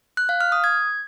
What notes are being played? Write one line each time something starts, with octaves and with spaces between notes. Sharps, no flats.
F#6
F5
F6
D#6
G#6